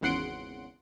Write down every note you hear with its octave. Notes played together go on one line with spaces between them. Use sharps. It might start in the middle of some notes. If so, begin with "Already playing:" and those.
G#1 E2 C#3 F#5 C6 D7